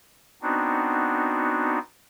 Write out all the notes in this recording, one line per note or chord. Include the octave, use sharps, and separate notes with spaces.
B3 C4 D4 D#4 F#4